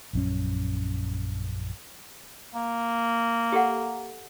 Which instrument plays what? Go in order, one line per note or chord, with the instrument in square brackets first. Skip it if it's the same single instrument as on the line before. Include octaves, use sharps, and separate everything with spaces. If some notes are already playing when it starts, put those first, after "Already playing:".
[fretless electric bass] A#1 F#2 C#4
[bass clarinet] A#3
[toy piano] G4 A4 F#5